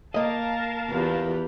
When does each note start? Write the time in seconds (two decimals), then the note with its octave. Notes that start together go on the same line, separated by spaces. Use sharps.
0.14 A#3 A#4 D#5 F5 A5
0.90 E2 F4 G4 B4